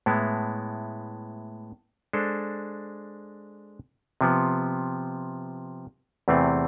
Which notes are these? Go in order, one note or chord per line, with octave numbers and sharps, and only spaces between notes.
A2 G#3 B3 E4
G#3 D4 A4 C5
C3 F3 B3
E2 C3 E3 A3 C4